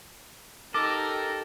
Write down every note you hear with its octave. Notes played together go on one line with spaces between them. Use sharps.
D#4 G4 A4 A#4 D6